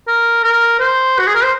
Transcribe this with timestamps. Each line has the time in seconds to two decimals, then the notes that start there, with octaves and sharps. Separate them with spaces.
0.07 A#4
0.44 A#4
0.80 C5
1.19 F#4
1.27 G#4
1.35 A#4
1.44 C5